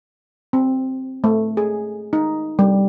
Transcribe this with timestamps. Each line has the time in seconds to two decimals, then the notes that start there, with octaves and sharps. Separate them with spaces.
0.53 C4
1.24 A3
1.57 G#4
2.13 D#4
2.59 G3